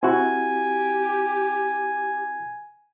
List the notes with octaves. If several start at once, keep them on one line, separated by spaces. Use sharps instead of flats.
C4 E4 F#4 G4 G#5